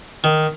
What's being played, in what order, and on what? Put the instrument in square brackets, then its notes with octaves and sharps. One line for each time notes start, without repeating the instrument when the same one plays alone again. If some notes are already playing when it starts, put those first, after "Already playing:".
[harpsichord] D#3